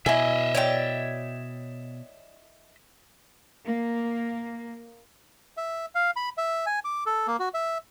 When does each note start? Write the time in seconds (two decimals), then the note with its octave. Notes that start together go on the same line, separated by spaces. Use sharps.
0.06 B2 E4 D#5 E5 G#5
0.55 C#5 D5 G5
3.64 A#3
5.57 E5
5.95 F5
6.16 B5
6.38 E5
6.66 G#5
6.85 D6
7.06 A4
7.27 A#3
7.39 F#4
7.54 E5